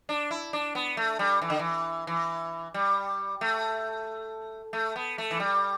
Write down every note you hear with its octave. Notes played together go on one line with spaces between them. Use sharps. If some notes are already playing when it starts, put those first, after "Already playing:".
D4
E4
D4
B3
A3
G3
E3
D3
E3
E3
G3
A3
A3
B3
A3
E3
G3